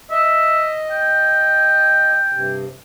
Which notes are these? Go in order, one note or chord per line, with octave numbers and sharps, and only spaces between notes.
D#5 E5
G5
G2 C3